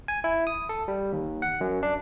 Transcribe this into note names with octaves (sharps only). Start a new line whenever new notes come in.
G#5
E4
D#6
A4
G3
D#2
F#5
F#2
D4